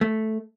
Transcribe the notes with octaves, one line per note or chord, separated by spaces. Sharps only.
A3